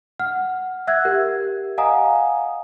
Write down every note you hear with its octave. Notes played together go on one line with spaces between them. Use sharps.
F#5 F6
E5 F#5 E6 F#6 G#6
G4 A#4
D#5 F5 F#5 G#5 A#5 D#6